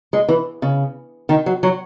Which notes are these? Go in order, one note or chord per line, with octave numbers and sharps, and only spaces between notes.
G#3
E3
C#3
D#3
F#3
F#3